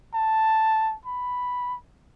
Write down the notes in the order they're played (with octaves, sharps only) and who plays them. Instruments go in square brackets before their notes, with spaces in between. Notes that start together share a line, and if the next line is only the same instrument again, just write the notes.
[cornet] A5
B5